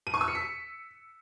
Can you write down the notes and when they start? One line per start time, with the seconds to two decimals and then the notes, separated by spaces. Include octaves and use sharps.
0.07 D#7
0.14 C#6
0.21 E6
0.28 C#7
0.35 B6